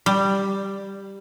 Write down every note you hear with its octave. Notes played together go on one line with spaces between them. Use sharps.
G3